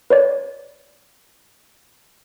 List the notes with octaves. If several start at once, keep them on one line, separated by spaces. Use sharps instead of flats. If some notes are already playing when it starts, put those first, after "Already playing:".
B4 C#5 D5